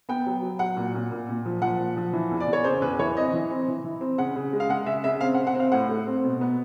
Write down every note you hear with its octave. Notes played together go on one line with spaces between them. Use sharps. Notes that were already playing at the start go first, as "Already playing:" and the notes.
B3 G5
F#3
F#3
F#3 F#5
A#2
A#2
A#2
A#2
F3
F3 F#5
A#2
F3
E3
E2
D5
E2
C#5
C#3 C5
E2 B4
E3 C#5
C4 D#5
E3
C4
E3
E3
C4
C#3 F#5
C#3
G#3
F5
G#3 F#5
C#3 E5
C#3 E5
C4 F5
F#5
C4
F#5
C4
F5
A2 F#5
A3
C4
B2
B3